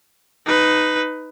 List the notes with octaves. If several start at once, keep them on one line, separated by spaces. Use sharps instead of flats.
D#4 B4